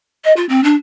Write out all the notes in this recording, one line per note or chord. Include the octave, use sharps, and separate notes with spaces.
D#5
F4
C4
D4